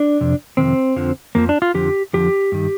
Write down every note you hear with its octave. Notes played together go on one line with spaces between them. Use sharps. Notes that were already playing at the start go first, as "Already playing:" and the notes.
Already playing: D4
F2 C3
F2 C3 D#3 C4
F2 D3 F3
F2 D3 F3 A#3
D4
F4
F2 D3 F3 G4
F2 D3 F3 G4
G2 D#3